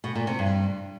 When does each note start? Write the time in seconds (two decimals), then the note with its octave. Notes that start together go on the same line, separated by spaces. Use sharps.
0.04 B2
0.15 A#2
0.27 C3
0.39 G2